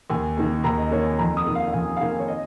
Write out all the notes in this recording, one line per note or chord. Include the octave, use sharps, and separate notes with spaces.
D#2 G#5
D#3 A#3
D#2 A#5
D#5
D#3 A#3 C#5
G#5
F2 A#5
D#6
D#3 A#3
F5
F5
F2 G#5
F5
D#3 A#3 G#5
C#5
D#5